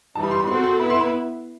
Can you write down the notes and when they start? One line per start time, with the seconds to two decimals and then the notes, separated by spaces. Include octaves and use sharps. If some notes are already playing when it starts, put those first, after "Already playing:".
0.15 E3 G3 D#4 A5
0.23 B5
0.31 C6
0.39 B5
0.47 C4 F#4 A4 C5 C6
0.63 C6
0.79 B3 E4 B4 B5
0.90 C6
1.01 B5